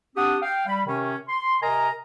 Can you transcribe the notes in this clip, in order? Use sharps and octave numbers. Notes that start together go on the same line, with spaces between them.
C4 D4 G4 F#5 D#6
F5 G5
G3 B5
C3 D#3 C#4
C6
C3 A#4 D#5 G#5 A#5